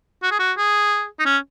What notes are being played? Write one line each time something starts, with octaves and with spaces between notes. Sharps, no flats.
F#4
G#4
F#4
G#4
D#4
C#4